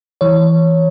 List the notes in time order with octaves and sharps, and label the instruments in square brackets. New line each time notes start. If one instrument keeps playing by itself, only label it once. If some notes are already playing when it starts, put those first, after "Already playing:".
[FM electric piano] E3 C#5